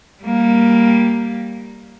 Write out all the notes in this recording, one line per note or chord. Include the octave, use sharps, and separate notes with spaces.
G3 A#3